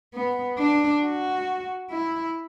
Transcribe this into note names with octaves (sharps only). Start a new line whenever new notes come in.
B3
D4
F#4
E4